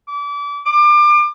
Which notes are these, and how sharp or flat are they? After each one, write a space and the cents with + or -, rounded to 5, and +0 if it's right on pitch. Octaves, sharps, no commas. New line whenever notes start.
D6 -30
D6 +30